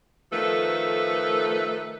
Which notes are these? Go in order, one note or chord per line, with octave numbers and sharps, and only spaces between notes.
D#3 F3 A3 A4 B4